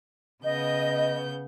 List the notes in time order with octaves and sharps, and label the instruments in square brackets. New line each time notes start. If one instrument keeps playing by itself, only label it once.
[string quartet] C#3 B3 G6 [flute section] D#5